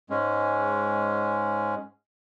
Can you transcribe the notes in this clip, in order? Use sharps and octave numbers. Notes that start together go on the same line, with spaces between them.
G#2 G#3 C#4